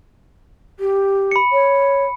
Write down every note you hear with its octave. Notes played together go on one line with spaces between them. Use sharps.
G4
B5 C#7
C#5